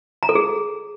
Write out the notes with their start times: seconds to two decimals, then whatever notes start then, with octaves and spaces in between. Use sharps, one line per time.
0.23 A#5
0.29 A4
0.35 G#4